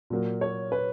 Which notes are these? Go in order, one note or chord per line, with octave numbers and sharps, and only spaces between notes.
A#2 F#3 A#3
C#5
B4